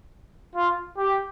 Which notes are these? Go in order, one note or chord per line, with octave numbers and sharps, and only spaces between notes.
F4
G4